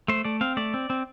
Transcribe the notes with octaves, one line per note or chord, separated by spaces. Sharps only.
A3 C5
A3 D5
C4 F5
A3 D5
C4
C4